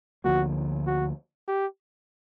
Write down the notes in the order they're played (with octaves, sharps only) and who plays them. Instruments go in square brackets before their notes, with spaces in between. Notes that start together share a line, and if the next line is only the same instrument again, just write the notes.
[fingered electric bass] D2 D3 F3 A#3 [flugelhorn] F#4
[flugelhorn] F#4
G4